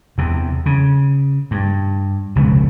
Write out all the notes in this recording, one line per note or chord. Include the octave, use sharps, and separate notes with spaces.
E2 C3
C#3
G2
F1 C#2 B2